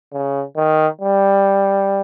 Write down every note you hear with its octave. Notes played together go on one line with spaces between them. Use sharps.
C#3
D#3
G3